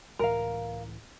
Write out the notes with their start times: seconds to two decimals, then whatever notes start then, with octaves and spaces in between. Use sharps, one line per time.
0.19 C#2 A2 E3 A#4 F5